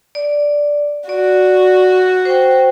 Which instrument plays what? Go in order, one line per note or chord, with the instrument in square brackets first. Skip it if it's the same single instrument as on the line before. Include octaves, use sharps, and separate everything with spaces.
[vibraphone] D5
[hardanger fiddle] F#4 [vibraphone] D5
[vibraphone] C5 G5